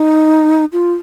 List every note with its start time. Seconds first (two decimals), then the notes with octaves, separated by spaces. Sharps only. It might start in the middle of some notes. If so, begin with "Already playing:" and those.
Already playing: D#4
0.73 F4